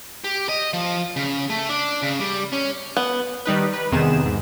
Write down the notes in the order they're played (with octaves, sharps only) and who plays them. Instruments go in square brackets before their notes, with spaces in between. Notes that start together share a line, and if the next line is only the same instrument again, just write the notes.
[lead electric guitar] G4
D#5
F3
C#3
A3
D4
C#3
G3
C#4
[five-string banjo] B3
[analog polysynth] D#3 G3 D#4 B4
B4
E2 C3 D#3 B3 G#4 E7
G#2